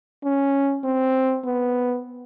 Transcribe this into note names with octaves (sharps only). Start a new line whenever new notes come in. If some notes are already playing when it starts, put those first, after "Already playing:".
C#4
C4
B3